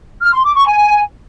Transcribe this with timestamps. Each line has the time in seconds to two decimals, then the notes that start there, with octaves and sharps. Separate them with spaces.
0.22 F6
0.33 C6
0.44 D6
0.55 C#6
0.66 G#5